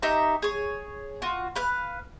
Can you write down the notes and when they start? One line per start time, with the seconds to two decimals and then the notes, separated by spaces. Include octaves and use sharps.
0.02 D#4 G4 E5 A#5
0.42 G#4 C#5
1.22 F4 F#4
1.56 B4 F5 F#6